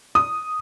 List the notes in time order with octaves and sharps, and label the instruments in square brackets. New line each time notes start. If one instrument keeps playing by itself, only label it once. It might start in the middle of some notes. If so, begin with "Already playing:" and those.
[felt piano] D#6